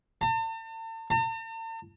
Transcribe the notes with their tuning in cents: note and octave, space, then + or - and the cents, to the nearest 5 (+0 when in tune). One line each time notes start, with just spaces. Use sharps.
A5 +40
A5 +45